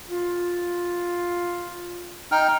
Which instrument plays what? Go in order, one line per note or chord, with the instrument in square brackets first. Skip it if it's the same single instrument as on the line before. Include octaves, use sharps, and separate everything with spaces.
[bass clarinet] F4
[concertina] D#4 G5 F6